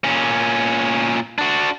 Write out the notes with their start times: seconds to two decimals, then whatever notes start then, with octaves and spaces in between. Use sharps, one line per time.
0.04 A#2 C#4
1.38 D4 F#4